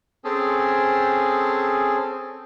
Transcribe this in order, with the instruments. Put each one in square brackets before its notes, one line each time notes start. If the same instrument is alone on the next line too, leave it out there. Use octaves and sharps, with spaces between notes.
[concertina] C4 C#4 G#4 A4